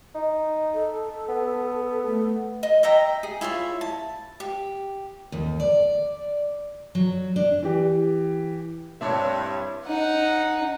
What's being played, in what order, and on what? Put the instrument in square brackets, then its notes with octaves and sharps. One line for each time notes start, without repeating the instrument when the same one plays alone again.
[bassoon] D#4
[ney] A4
[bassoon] B3
[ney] A3
[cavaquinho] D#5
D#5 E5 G5 A#5
G#4
E4 F4 C#5 E5
A5
G4
[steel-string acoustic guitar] D#2
D5
F#3
D4
[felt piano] E3 G4
[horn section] G2 [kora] C4 D4 E4 [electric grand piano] C#5 E5
[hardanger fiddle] D#4 F#5